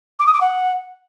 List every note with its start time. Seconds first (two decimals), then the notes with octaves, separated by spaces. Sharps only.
0.19 D6
0.26 D#6
0.33 D6
0.40 F#5